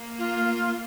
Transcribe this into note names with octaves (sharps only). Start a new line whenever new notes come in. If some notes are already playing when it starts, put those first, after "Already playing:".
Already playing: A#3
F4